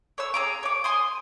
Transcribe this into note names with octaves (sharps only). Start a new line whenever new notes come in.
C#5 E6
G#4 A#5 D6
C#5 D6
G#5 C6 D#6